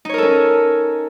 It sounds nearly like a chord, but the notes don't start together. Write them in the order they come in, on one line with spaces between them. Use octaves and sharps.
D#4 C#5 A#4 A4 C#4